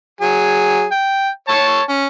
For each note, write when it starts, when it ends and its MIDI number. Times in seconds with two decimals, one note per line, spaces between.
0.21 0.85 54
0.21 0.85 68
0.92 1.29 79
1.48 1.81 73
1.48 1.81 81
1.48 1.81 85
1.89 2.06 61